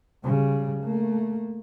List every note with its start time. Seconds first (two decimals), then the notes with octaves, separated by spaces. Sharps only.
0.23 C#3 G3
0.83 A3 A#3